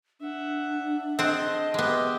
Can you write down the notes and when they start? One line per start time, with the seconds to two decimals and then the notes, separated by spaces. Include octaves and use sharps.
0.20 D4 E5 F#5
1.19 C4 G#4 D#5 F#5 A5 C6
1.74 G#3 B3 G4 E5